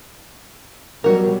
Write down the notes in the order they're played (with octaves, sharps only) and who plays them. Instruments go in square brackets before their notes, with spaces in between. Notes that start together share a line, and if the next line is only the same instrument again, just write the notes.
[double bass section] B2 F#3 G3 [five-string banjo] F#4 A#4